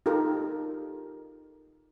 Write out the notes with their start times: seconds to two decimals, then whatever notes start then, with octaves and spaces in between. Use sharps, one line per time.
0.06 D#4 F4 G4 A4 A#4